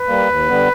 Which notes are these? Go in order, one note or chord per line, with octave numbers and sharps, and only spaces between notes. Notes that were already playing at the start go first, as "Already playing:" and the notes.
Already playing: B4
G3 A#3
D#2
D3 G3 B3